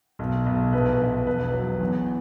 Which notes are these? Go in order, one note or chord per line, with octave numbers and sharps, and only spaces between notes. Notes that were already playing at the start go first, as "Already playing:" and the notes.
B1
B1
A#1 B4
A#1
E1 B4
F#3
E2